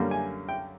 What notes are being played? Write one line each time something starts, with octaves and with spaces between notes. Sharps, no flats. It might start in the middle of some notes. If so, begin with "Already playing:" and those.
Already playing: F#2 D3 G3 A#3 C#4
G#5
G5